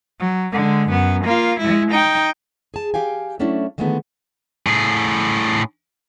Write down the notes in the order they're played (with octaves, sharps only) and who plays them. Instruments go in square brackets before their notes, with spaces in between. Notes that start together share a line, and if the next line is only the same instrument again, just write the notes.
[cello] F#3
D3 G#3
F#2 B3
A#3 F4
G#3 E4
D#4 G5
[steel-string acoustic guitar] G#4 A5
G4 F5 G5 G#5
F#3 A3 C#4 D4 E4
D3 D#3 F3 G#3 A3 B3
[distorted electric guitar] A2 G#4